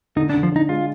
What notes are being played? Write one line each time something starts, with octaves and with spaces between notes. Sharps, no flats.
D3 D#4
D4
D3
F3
D4 D#4
G#3 F4